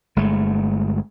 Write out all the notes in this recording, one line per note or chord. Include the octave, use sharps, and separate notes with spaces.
G1 G#3 A3